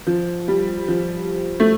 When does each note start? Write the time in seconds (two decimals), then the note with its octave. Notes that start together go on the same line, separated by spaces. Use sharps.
0.07 F3
0.48 G3
0.88 F3
1.60 A3